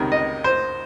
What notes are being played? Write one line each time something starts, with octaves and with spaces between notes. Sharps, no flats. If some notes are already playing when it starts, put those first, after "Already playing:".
Already playing: C#2 C3 D#3
D#5
C5